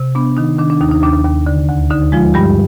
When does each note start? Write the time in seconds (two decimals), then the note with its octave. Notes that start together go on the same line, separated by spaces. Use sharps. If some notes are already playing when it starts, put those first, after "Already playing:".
Already playing: C3
0.15 B3 D4
0.37 D#3 D#4
0.59 D#3 D4
0.70 D4
0.81 D#2 D#4
0.91 D#4
1.02 D#2 D4
1.25 D#2
1.47 D3
1.69 D2
1.90 D3 D#4
2.12 F3 G#3 F4
2.34 G2 G3 G4